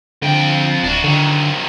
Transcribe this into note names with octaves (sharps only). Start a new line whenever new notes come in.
F2 D3 G5
D1 D4 F#4
D3 D#3 F#3